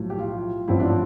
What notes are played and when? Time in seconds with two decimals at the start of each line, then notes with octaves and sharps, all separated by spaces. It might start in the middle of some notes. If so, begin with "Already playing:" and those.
Already playing: B1 A2 F3
0.10 G4
0.19 F4
0.68 A1 G2 F3 C4 E4
0.80 D4